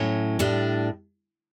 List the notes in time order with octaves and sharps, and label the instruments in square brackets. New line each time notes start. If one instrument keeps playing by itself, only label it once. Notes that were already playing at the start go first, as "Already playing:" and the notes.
Already playing: [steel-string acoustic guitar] A2 F#3 C#4
A2 G3 D4